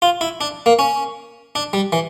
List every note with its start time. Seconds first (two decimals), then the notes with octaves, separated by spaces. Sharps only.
0.02 F4
0.21 E4
0.41 D4
0.66 A#3
0.79 C#4
1.55 D4
1.73 G3
1.92 E3